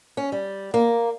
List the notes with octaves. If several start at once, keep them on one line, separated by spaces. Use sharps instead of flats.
C#4
G3
A#3